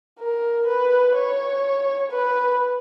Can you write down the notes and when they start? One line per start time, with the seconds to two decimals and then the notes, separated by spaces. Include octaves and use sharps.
0.19 A#4
0.67 B4
1.15 C#5
2.11 B4